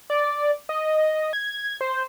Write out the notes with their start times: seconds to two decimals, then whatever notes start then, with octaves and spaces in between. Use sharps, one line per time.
0.10 D5
0.69 D#5
1.33 G#6
1.81 C5